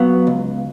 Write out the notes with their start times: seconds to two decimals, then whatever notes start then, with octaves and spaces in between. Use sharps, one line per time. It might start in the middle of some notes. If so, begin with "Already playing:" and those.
Already playing: F#3 B3 F4
0.27 C#2